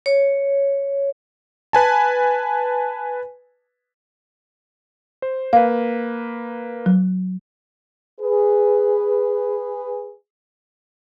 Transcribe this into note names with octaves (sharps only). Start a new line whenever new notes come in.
C#5
B4 G#5 A5
C5
A#3 B4 F5
F#3
G#4 B4